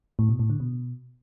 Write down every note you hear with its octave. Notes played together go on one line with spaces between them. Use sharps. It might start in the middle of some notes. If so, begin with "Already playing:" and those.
A2
B2
A2
D3
B2